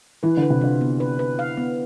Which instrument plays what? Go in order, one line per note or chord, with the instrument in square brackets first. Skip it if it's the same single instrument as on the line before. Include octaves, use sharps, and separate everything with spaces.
[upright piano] E3 [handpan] B4
[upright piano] D3
[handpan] B4
[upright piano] C3
[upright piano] D3 [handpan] F4
[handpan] B3
B4
B4
F5
B3